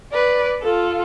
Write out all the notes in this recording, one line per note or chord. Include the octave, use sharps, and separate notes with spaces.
B4 D5
F4 A4